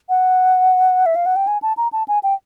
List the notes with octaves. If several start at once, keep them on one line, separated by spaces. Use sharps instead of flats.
F#5
E5
F5
F#5
G5
G#5
A5
A#5
A5
G#5
G5